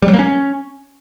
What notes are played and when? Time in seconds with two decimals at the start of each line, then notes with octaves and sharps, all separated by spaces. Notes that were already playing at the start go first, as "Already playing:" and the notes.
0.02 G3
0.08 F#3
0.13 A#3
0.19 C#4